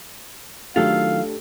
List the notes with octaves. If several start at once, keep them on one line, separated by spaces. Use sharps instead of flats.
D#3 F#3 A3 D4 F4 G4 A4 F5